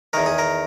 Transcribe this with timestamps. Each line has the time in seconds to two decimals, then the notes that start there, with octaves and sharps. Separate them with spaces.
0.13 E2 D#3 A#4
0.26 G#4
0.38 A#4